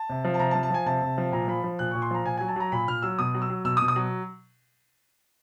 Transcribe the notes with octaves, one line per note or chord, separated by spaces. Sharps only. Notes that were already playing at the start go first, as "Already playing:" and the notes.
Already playing: A5
C3
F3
A5
C3 A#5
A5
F3
A5
F3 G#5
C3 A5
C3
F3
A#2 A#5
F3 B5
F3
A#2 F#6
A#2 C#6
C6
F3 A#5
A#2 G#5
F#3 G#5
A5
F#3 A#5
A#2 B5
A#2 F6
F#3 E6
B2 D#6
F#3
E6
F#3
B2 E6
D#6
B2
D#6
F#3